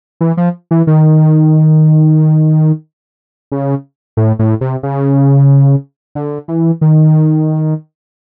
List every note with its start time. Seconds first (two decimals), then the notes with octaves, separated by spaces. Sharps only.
0.21 E3
0.37 F3
0.71 E3
0.87 D#3
3.52 C#3
4.17 A2
4.39 A2
4.61 C3
4.83 C#3
6.15 D3
6.48 E3
6.81 D#3